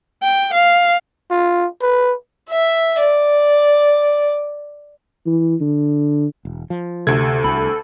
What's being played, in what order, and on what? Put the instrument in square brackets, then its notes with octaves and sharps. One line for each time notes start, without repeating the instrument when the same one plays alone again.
[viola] G5
F5
[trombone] F4
B4
[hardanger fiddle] E5
D5
[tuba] E3
D3
[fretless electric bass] E1
F3
[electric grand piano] D2 G#6 [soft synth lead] C3 [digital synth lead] A4
[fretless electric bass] C2 [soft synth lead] B5